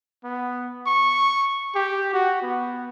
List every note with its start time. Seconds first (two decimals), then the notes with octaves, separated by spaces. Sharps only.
0.24 B3
0.87 C#6
1.75 G4
2.14 F#4
2.43 B3